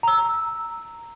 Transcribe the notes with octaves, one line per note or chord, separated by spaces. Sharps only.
A#5 E6